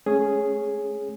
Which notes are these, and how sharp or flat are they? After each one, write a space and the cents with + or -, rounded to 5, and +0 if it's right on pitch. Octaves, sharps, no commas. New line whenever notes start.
A3 -30 C#4 +0 G#4 +0